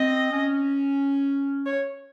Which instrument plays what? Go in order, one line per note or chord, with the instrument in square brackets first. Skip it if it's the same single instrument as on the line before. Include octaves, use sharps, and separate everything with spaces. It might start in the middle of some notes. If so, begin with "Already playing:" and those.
Already playing: [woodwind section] C4 [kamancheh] D#5
[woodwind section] C#4
[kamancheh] C#5